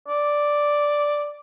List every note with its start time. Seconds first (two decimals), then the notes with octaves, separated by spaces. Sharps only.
0.08 D5